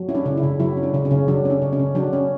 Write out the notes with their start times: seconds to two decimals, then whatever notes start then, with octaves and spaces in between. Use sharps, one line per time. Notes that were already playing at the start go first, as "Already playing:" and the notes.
Already playing: F#3
0.09 C#4 E4
0.15 D4
0.26 C#3
0.37 E4
0.43 C#3
0.60 F#3 E4
0.77 C#4
0.83 D4
0.94 C#3
1.05 C#4
1.11 C#3
1.28 F#3 D4
1.45 C#4 D4
1.62 C#3
1.73 C#4
1.79 C#3
1.95 F#3 D4
2.13 C#4